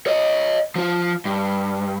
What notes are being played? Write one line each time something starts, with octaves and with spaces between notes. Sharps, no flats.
C#5 D#5
F3 F4
G2